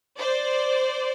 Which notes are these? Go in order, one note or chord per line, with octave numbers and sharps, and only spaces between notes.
C5 D5